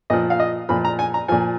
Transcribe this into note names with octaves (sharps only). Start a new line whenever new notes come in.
A#2 F3 D#5
F5
D#5
A#2 F3 B5
A#5
G#5
A#5
A#2 F3 G#5